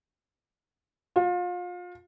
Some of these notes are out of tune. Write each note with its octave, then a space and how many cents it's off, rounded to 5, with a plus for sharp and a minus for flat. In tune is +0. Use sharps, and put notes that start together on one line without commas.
F4 +30